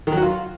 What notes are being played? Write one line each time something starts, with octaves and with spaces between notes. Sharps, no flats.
D#3
F#3
F#4
F4